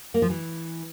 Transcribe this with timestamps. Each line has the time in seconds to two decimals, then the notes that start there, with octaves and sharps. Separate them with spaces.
0.14 A#3
0.22 F3
0.30 E3